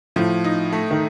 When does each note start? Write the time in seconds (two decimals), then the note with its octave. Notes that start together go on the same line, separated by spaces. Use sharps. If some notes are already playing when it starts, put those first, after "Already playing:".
0.16 A2 F3
0.44 D#4
0.72 A3
0.91 D#3